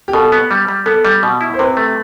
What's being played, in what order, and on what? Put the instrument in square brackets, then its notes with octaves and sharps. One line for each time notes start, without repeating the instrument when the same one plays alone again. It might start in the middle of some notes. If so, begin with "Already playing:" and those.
[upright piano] G4
[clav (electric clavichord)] B2 [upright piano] A4
[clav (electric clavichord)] B3
G3
G3
[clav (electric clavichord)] B3 [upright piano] A4
[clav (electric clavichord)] G3
B2
E4
[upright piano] C5
[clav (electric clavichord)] C3 [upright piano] B4
[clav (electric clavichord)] A3